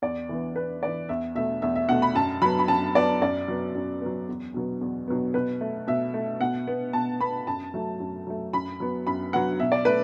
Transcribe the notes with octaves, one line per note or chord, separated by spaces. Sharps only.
E2 D5
E3 B3
E2 B4
E3 B3 D5
E2 E5
B2 A3 E5
E2 E5
E5
B2 A3 F#5
B5
F#2 A5
F#3 B3 B5
B5
F#2 A5
F#3 B3 D5
F#2 D5
F#3 B3
F#2
F#3 B3
E2
B2 F#3 B3
E2
B2 F#3 B3
B2 B4
A3
B2 E5
A3
B2 F#5
B3
B2 A5
B3 B5
F#2 A5
F#3 A3
F#2
F#3 A3
F#2 B5
F#3 B3
F#2 B5
F#3 B3 F#5
B2 E5
D5
A3 B4